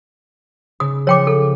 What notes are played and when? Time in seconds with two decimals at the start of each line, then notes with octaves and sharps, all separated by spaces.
0.80 C#3 D#6
1.07 F3 C#5 G5 D6
1.27 A4